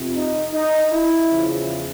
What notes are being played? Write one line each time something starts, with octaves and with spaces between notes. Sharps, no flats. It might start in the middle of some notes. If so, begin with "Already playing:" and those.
Already playing: F2 C3 F3
D#4
D#4
E4
E2 C#3 F3